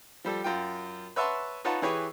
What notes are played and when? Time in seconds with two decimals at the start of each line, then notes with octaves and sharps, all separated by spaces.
0.25 F3 G3 A4
0.44 F#2 F4 G5
1.16 B4 C#5 E5 F#5 A5 C6
1.65 D#4 F4 B4 C#5 F#5 A5
1.82 E3 E4 G4 G#4 B4 C#5